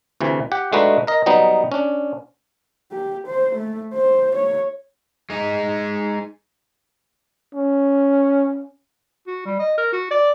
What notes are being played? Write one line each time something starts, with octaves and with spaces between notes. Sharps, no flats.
D2 C3 E3
G4 F#5
G#3 A3 D4 D#4 F#4 B4
A#4 D#5
F#3 G3 B3 D#4
C#4 D4
G4
C5
A3
C5
C#5
G#3 D#4
C#4
F#4
G3
D#5
A#4
F#4
D5